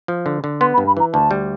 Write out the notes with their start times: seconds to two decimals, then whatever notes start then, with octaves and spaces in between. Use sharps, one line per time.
0.08 F3
0.26 D3
0.44 D3
0.61 B3 C6
0.74 B5
0.78 G2
0.87 B5
0.97 E3 A#5
1.13 D2 A5
1.31 G3